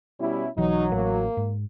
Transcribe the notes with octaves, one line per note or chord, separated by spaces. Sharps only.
B2 G3 C#4 E4
B1 B2 E3 F#3 D#4
A1 A#3
G#2